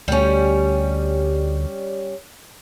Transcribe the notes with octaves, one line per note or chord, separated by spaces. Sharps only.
D2 G3 C#4